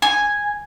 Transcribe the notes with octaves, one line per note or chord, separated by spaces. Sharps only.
G#5